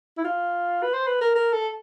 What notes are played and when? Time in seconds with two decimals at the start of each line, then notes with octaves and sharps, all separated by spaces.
0.17 E4
0.25 F4
0.83 B4
0.94 C5
1.07 B4
1.21 A#4
1.35 A#4
1.53 A4